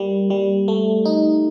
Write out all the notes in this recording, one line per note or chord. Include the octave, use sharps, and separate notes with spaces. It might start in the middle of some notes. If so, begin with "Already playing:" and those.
Already playing: G3 A#3
G3
A3
D#4